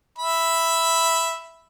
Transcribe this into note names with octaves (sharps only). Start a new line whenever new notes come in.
E5 B5